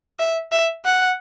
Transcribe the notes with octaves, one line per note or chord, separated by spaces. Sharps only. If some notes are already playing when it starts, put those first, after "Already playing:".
E5
E5
F#5